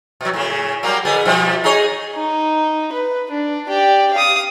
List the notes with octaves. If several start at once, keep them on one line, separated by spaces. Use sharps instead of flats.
B2 F#3
A2 C#3
F#3 G3 A#3
D3 B3 G#4
B2 F3 G3
D#4 G#4 C#5
D#4
B4
D4
G4 D5
F5 D#6